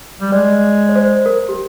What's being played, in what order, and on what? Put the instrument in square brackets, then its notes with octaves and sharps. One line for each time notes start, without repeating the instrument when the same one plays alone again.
[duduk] G3
[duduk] G#3 [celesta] D5
[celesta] C#5
C5
A#4
G4